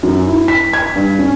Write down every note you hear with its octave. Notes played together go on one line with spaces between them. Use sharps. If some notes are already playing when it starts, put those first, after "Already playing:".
F#2
E4
B6
G#6
G2
C#4